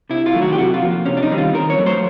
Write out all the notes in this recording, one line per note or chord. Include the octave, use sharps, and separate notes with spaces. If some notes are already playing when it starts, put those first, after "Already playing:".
C3 E4
F4
D#3 F#3 A3
F#4
G4
C3 F#4
F4
F3 A#3
C3 C#4
D4
D#4
D#3 G3 C4
F4
D#3 A#4
C#5
F#3 A3
C5